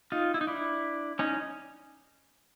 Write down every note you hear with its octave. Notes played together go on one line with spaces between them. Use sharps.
D#4 F4
E4
D#4
D4 E4
C#4 D#4